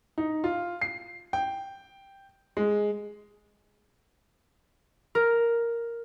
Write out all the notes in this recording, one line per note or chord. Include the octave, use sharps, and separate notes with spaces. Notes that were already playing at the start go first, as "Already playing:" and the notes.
D#4
F4
C7
G5
G#3
A#4